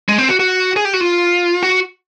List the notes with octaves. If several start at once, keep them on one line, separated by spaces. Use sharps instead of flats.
G#3
C4
F#4
F#4
G#4
G4
F#4
F4
F#4